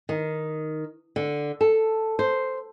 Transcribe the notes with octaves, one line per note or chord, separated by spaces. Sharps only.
D#3
D3
A4
C5